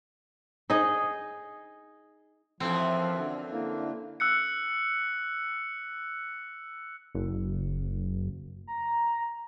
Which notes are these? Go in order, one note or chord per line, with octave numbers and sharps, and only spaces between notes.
D#4 G#4 D#5
F#2 E3 F3 C4 A4
D3
D3 A#3 D4 E4
E6 F#6 C#7
F#1
A#5